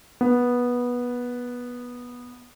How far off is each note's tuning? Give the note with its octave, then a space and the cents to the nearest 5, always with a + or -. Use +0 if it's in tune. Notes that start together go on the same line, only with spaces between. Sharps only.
B3 -15